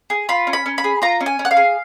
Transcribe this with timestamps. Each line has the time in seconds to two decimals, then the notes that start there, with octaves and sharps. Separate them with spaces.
0.10 G#4
0.29 F4 B5
0.47 C#4
0.53 B5
0.66 C#4
0.78 B5
0.84 G#4
1.02 F4 A#5
1.21 C#4
1.26 G#5
1.39 C#4
1.45 F#5
1.51 F5
1.57 G#4